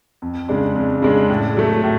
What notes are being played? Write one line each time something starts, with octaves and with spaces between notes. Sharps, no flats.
F2
C#3 G#3 D4
F2
C#3 G#3 D4
A2
F#3 A3
A2